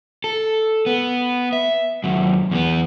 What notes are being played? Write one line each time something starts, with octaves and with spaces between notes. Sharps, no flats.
A4
B3
E5
D#2 F#3
E2 B3